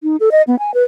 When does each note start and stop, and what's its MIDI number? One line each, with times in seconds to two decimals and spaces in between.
0.03 0.16 63
0.20 0.29 69
0.31 0.42 75
0.47 0.58 59
0.59 0.71 80
0.74 0.83 71